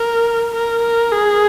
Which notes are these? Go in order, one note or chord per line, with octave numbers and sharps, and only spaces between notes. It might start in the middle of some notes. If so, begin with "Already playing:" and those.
Already playing: A#4
A#4
A#4
G#4